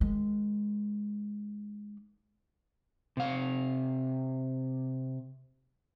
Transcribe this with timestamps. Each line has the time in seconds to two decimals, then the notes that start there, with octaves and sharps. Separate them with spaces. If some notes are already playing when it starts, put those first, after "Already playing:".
0.01 D#3 G#3
3.17 C3 F5